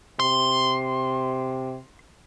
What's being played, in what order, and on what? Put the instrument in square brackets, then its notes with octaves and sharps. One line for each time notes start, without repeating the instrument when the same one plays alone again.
[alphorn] C3 [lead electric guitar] C6